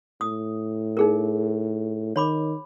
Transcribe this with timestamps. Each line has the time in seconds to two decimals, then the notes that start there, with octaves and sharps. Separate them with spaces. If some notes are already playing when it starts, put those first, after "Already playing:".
0.21 A2 D#6
0.97 D#4 G#4 A#4
2.16 D#3 C#5 B5 D6